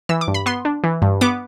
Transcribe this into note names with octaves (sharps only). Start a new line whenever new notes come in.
E3 E6
D6
G2
B5
B3 C6
D4
E3
G2
B3 D6